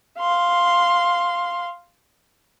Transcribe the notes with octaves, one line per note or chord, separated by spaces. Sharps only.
F5 C6